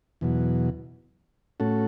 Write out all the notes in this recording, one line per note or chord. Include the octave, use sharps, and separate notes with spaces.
E2 B2 F#3
A2 A3 C#4 F#4 A4